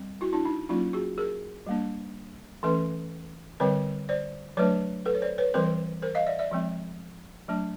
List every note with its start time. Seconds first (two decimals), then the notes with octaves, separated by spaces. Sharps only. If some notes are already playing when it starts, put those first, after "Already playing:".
Already playing: G3 C4
0.21 E4 F#4
0.33 D4 E4
0.45 D#4
0.69 F#3 A#3 C#4 D#4 F4
0.93 F#4 G#4
1.18 G#4 A#4
1.67 G3 A#3 D4
2.63 E3 A3 C#4 A4 B4
3.60 D3 G3 C4 B4 C#5
4.09 C5 D5
4.57 F#3 A3 D4 B4 C#5
5.05 A4 B4
5.15 C#5
5.22 C5 D5
5.38 B4 C#5
5.54 E3 G3 C4 A#4 C5
6.02 A#4 C5
6.15 D#5 F5
6.26 D5 E5
6.39 D5 E5
6.51 F3 G#3 C4
7.48 F#3 A3 D4